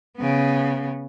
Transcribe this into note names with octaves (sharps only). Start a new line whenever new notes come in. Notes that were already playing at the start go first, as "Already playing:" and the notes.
C#3 B3